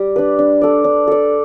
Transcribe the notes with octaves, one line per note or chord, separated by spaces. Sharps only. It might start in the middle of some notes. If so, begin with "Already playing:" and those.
Already playing: G3
D4 B4
D4
A4 D5
D4
A4 D5